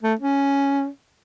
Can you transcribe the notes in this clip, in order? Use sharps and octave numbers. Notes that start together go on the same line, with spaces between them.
A3
C#4